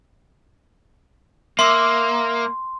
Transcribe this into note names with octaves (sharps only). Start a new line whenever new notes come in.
A#3 E5 C6 D6 E6